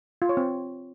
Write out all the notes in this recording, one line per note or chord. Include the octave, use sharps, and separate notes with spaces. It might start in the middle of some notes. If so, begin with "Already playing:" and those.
F4
C#5
C4